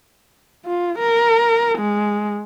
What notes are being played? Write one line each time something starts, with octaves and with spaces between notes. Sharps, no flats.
F4
A#4
G#3